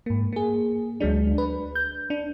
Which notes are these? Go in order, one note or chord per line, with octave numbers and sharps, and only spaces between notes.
G#2 A#3
A#3 G#4
D2 F#3 G#3 D4
B4
G6
D4